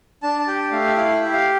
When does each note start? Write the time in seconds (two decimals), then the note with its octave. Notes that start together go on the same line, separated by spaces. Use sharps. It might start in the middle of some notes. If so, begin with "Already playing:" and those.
0.23 D4 A5
0.39 A5
0.48 G4 G5
0.72 A3 F5
0.89 E5
0.96 E4 F5
1.14 E5
1.20 G4
1.33 F5